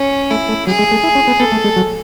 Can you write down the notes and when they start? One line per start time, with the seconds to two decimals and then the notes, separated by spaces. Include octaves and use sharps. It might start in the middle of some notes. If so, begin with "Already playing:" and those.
Already playing: C#4
0.30 A3 E4
0.49 A3
0.67 F#3 G#4
0.79 G#3
0.91 A3
1.04 E4
1.15 C#4
1.27 B3
1.39 B3 A4
1.52 A3
1.64 G#3
1.76 F#3